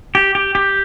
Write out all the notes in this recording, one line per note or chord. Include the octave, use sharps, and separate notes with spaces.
G4
G4
G4